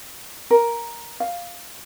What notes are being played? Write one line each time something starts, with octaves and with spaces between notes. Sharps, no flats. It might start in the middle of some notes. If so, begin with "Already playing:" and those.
A#4
F5